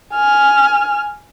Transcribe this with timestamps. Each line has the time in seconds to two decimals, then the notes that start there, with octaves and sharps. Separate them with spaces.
0.14 G#5 F6